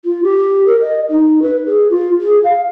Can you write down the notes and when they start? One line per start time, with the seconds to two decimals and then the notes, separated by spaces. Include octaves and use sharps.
0.05 F4
0.23 G4
0.66 A#4
0.81 D#5
1.09 D#4
1.42 B4
1.66 G#4
1.90 F4
2.21 G#4
2.44 F5